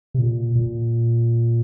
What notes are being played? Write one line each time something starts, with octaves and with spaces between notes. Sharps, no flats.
C3
A#2
A#2